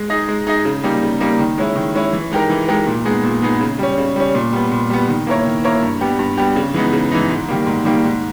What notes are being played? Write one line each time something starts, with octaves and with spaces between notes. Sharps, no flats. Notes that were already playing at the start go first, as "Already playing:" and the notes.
Already playing: G#3
D#4 G#4 D#5
G#3
D#4 G#4 D#5
C#3
G3 A#3 D#4
C#3
G3 A#3 D#4
D#3
G#3 C#4 E4
D#3
G#3 C#4 E4
E3
G#3 D#4 G4 A#4
E3
G#3 D#4 G4 A#4
A#2
G#3 B3 D#4 G#4
A#2
G#3 B3 D#4 G#4
C#3
G3 C#4
C#3
G3 C#4
A#2
G3 B3
A#2
G3 B3
D#3
A#3 E4 A#4 C#5
D#3
A#3 E4 A#4 C#5
G2
G3 B3 G4
G2
G3 B3 G4
C#3
E3 G#3 B3 D#4
C#3
E3 G#3 B3 D#4
G#2
D#3 G3 A#3
G#2
D#3 G3 A#3
G#2